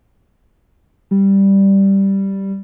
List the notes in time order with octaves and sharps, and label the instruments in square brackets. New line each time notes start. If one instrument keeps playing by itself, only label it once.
[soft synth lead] G3